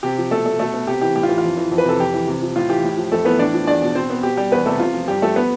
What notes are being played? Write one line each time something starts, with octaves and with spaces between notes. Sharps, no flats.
C3 G4
F3
B2 A3 A4
A3
B2 A3 A4
B3
C3 G4
E3 G4
A2 G4
F4
E3
F4
F2
E3
F2
B4
C3 A4
F2 G4
E3
C3
F3
A2 F4
E3 G4
A2
F3
F2 A3 A4
E3 B3 B4
A2 D4 D5
F3
E2 D4 D5
B2
B2 C4 C5
B3
B2 G4
G3 G4
E2 B3 B4
C3 A3 A4
C3 F4
F3
G2 G4
F3 A3 A4
B3 B4